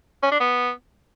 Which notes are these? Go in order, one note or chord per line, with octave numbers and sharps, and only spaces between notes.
C#4
D4
B3